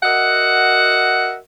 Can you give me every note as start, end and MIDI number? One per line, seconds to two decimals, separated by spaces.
0.03 1.36 66
0.03 1.36 70
0.03 1.36 75
0.03 1.36 76
0.03 1.36 78